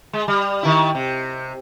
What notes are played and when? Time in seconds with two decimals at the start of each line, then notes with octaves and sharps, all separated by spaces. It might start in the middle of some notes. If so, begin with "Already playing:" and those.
0.13 G#3
0.28 G3
0.63 D#3 E4
0.95 C3